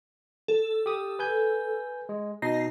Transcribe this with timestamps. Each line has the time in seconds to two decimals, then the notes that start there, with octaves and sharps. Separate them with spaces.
0.48 A4
0.86 G4 D#6
1.19 B4 G#5 G6
2.09 G#3
2.42 B2 D#4 A#6 C7